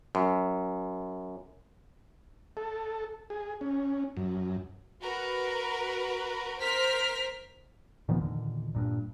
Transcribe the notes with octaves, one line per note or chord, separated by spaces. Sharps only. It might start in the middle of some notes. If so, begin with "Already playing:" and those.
F#2
A4
G#4
C#4
F#2
F#4 A#4 B4
A#4 C5 F6 B6
A#2 D#3 F3 B3
E2 A#2 D3 D#3
G2 A#2